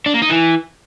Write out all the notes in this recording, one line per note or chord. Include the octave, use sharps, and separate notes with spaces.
D4
A#3
D#4
E3